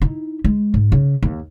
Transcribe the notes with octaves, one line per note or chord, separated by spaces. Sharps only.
D#4 E4
G#3
G#2
C#3
D#2